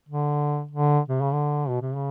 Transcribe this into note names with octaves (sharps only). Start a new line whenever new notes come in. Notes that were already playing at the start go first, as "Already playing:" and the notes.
D3
D3
C3
C#3
D3
B2
C3
C#3